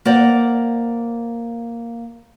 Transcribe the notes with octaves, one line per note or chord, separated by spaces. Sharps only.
A#3 C5 D5 F#5